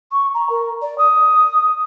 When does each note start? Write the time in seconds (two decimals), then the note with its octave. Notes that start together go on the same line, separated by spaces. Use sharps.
0.12 C#6
0.34 A#5
0.50 A#4
0.82 D5
0.98 D#6